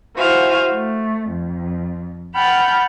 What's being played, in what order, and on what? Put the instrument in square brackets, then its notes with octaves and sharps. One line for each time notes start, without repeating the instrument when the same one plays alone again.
[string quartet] E4 F#4 C5 F5 G#5
A3
F2
F#5 G5 A5 B5 F6 G6